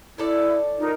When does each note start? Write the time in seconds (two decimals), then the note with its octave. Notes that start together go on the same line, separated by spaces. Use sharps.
0.18 A2 E4 A4 D5
0.79 D#4 F4 A#4